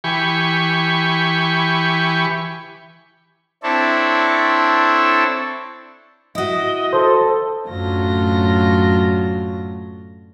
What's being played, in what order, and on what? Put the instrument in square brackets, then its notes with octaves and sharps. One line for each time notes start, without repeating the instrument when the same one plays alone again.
[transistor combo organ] E3 G4 G#5 B5 C#6
[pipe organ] C4 D4 E4 A4 C#5
[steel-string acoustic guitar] E4 F#4 [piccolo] D#5
[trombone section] A4 [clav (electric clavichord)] C5
[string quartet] F#2 A2 D3 F#3 F4 A#6